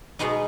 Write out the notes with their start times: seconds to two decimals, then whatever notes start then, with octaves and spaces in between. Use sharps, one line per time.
0.19 B2 G#3 B3 D#4